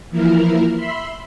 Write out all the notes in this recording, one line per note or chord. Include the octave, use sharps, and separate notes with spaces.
E3 F3 A#3 E4 A#4 F6
E5 B5 C6